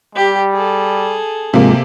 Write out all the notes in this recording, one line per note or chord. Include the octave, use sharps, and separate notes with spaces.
G3 G4
G#4 A4
G#2 C3 F3 G#3 A#3